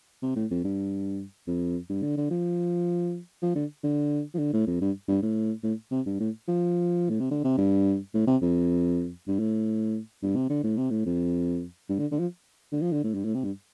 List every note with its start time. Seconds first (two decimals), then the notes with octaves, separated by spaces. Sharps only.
0.22 C3
0.36 A2
0.51 F2
0.64 G2
1.47 F2
1.89 G2
2.02 D3
2.17 D3
2.30 F3
3.42 F3
3.55 D3
3.83 D3
4.34 F3
4.38 D3
4.53 A2
4.67 F2
4.81 G2
5.08 G2
5.22 A2
5.63 A2
5.91 C3
6.06 G2
6.20 A2
6.48 F3
7.09 A2
7.20 C3
7.31 D3
7.44 C3
7.58 G2
8.14 A2
8.27 C3
8.41 F2
9.27 G2
9.39 A2
10.22 G2
10.36 C3
10.50 D3
10.63 A2
10.77 C3
10.90 A2
11.05 F2
11.89 G2
11.99 D3
12.11 D3
12.19 F3
12.72 D3
12.82 F3
12.92 D3
13.04 A2
13.14 G2
13.24 A2
13.34 C3
13.44 G2